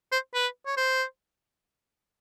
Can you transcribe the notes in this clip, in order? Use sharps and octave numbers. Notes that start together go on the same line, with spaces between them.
C5
B4
C#5
C5